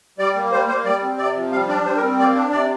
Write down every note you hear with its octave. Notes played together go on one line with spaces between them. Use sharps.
G3 D5
A#3
G3 C5
A#3 C5
G3 D5
C4
C3 D5
F3
G3 F5
D4 D5
G3 C5
A#4
C4
A#3 D5
D4
C3 D5